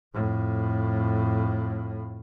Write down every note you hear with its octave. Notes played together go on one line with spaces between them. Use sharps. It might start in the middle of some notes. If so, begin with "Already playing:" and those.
F2 A2